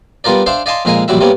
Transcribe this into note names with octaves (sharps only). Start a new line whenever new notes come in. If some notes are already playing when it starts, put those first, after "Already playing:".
G3 B3 F4 A#4 D5
D4 C5 E5 F5 G5
D5 D#5 F5 G#5 A5 C6
F2 A#2 G#3 A#4 F5 G#5
A#1 F#2 G3 F#4 E5
C3 G3 A#3 B3 C#4